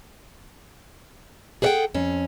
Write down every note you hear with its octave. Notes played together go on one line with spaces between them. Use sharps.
G#4 A4 B4 E5 F#5 G5
F2 C#4